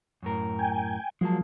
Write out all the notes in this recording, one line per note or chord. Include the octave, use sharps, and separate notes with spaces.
F#2 A2 A#4
G5 G#5
F3 F#3 G#3 A#3 A5